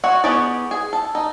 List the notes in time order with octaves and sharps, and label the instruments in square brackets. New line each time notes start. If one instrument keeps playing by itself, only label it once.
[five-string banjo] F#4 C#5 F#5
B3 G4 G#4 C#5 D5
G#4
A4
D#4